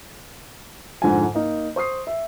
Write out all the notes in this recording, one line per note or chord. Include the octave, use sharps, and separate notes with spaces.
F2 G#2 D3 F3 G#5
A#3 D#4
C5 C#6 D#6 C7
E5